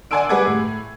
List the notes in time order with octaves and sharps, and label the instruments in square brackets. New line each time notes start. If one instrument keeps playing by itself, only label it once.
[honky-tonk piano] D5 F#5 G#5 C6 E6 D7
G3 G#4 B4 F#5 D6 G#6
A2